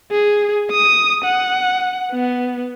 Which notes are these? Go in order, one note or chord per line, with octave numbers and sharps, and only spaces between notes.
G#4
D#6
F#5
B3